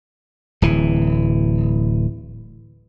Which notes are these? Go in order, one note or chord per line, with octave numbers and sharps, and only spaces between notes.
D1 E3